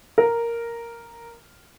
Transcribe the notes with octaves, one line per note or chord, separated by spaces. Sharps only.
A#4